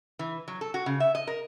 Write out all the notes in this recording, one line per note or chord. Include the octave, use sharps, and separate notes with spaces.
E3
F#3
A4
F#4
C#3
E5
D#5
A#4